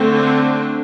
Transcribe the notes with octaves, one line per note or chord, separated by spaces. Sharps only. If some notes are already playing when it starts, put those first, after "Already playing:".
Already playing: D3 A3 C4
D4